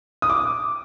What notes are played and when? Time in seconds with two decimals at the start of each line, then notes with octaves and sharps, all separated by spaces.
0.22 D#6
0.30 D6